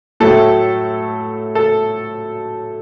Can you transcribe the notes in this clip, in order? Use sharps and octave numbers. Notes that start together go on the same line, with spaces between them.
A2 F#3 A3 A4
A4